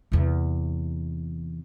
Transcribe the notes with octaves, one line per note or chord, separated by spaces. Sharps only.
E2 C3